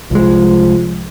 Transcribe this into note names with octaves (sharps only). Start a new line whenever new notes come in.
C2 F3 G#3